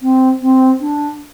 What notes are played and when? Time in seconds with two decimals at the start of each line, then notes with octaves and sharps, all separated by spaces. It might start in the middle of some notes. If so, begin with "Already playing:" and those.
0.02 C4
0.42 C4
0.80 D4